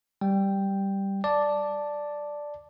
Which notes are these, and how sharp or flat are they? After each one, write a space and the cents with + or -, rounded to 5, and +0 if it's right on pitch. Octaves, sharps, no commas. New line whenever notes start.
G3 +0 G5 +0
D5 +0 A5 +0 D6 +0